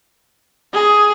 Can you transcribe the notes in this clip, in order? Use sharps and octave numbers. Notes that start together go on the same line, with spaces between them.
G#4